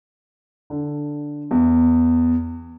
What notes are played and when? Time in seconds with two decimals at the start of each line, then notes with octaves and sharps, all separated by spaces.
0.70 D3
1.51 E2